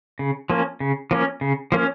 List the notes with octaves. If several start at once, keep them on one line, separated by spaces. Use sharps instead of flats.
C#3
F3 A#3 C#4
C#3
F3 A#3 C#4
C#3
F3 A#3 C#4